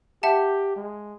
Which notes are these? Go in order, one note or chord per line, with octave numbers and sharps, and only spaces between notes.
G4 E5 F#5 A5
G#3